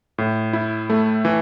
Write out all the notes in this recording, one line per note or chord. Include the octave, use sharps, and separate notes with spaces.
A2
E4
A3
E3